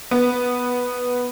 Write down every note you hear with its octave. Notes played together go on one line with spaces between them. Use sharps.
B3